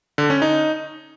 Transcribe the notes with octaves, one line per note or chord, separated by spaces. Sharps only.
D3
C#4
D#4